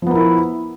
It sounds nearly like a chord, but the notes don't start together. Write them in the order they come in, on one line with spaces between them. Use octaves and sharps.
F3 B3 A#4 E4